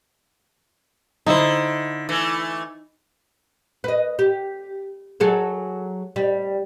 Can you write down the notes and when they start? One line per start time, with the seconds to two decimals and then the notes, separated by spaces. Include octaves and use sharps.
1.26 D3 D#4 E4 C5
2.09 E3 A3
3.84 B4 D#5
4.19 G4
5.20 F#3 G#4 A4
6.16 G3